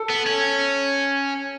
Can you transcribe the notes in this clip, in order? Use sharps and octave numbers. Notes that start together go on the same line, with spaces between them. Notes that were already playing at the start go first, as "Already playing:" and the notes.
Already playing: A4
B3
C#4